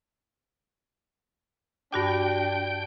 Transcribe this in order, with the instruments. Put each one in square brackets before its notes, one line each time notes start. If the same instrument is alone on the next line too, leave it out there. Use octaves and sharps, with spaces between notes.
[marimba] G2 F#4 D6 [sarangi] D4 [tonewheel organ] G5